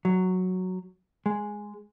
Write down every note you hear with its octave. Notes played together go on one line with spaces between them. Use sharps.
F#3
G#3